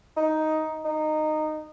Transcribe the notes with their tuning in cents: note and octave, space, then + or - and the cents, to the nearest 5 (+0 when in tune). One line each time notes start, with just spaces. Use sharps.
D#4 +5
D#4 -15